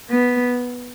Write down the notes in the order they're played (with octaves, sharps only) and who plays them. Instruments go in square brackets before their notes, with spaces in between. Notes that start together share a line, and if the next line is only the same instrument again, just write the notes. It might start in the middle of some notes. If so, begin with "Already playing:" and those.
[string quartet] B3